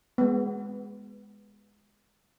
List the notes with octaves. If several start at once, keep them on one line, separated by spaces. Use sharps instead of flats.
G#3 B3